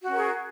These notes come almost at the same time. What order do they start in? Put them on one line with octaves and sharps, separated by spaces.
F#4 C#4 A#4 G#4